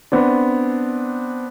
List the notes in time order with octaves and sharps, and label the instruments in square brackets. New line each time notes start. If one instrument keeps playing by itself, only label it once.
[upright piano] B3 C4 D4